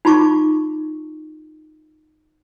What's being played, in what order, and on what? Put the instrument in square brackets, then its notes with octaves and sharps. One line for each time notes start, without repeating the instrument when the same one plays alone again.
[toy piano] D#4 F4 A5 C#6 D6